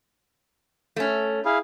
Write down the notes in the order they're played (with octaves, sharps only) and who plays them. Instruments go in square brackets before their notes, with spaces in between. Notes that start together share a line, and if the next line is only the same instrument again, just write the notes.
[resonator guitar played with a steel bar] A3 C#4
[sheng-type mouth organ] E4 G#4 F5